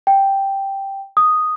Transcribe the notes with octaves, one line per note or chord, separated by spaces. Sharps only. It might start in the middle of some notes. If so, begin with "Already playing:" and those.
G5
D#6